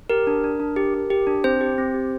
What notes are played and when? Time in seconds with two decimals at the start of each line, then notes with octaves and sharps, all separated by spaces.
0.10 G4 A#4
0.27 D4
0.44 D4
0.60 D4
0.76 G4
0.94 G4
1.10 G4
1.27 D4
1.44 C4 C5
1.61 G4
1.78 C4
1.94 G4